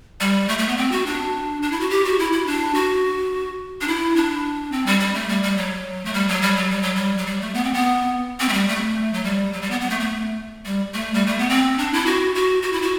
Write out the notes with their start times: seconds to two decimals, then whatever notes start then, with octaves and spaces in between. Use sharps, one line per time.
0.20 G3
0.48 A3
0.58 A3
0.68 B3
0.77 C4
0.91 F#4
1.06 D4
1.62 D4
1.72 E4
1.80 F#4
1.90 G4
2.05 F#4
2.19 E4
2.32 E4
2.46 D4
2.74 F#4
3.81 D4
3.88 E4
4.16 D4
4.72 C4
4.86 G3
5.00 G3
5.14 A3
5.29 G3
5.43 G3
5.57 F#3
6.05 A3
6.14 G3
6.28 F#3
6.42 G3
6.56 F#3
6.70 G3
6.83 F#3
6.95 G3
7.18 F#3
7.26 G3
7.41 A3
7.54 B3
7.64 C4
7.74 B3
8.40 C4
8.49 A3
8.53 G3
8.68 A3
9.14 F#3
9.24 G3
9.53 F#3
9.62 G3
9.71 B3
9.81 B3
9.90 A3
10.00 A3
10.65 G3
10.94 A3
11.14 G3
11.27 A3
11.39 B3
11.49 C4
11.78 D4
11.93 E4
12.06 F#4
12.35 F#4
12.62 F#4
12.72 E4
12.82 F#4